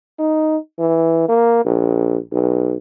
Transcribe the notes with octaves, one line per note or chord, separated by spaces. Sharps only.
D#4
E3
A#3
A#1
B1